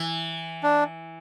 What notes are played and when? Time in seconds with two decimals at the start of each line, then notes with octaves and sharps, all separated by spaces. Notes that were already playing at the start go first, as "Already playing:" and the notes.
Already playing: E3
0.63 D4